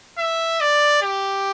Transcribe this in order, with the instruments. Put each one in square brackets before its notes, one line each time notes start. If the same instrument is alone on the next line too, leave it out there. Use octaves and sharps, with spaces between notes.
[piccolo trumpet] E5
D5
G4